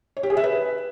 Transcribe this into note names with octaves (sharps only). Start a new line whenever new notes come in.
C#5
G4
G#4
E5
B4